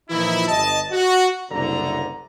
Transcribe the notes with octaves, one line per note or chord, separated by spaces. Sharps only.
A#2 E3 F3 D#4 E4
G1 D#5 A5
F#4
F#1 C2 D3 A#5